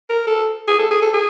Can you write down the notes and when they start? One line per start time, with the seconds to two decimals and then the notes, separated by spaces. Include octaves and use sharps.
0.10 A#4
0.27 A4
0.68 G#4
0.79 A4
0.91 G#4
1.02 A4
1.13 G#4